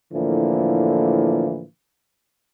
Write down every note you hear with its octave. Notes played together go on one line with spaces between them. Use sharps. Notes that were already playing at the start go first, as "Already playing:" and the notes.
A2 D3 E3 F3 A#3